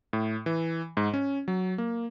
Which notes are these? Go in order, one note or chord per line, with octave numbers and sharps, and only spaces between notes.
A2
E3
G#2
C#4
F#3
A#3